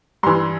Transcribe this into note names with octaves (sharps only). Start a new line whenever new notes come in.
G2 E3 C6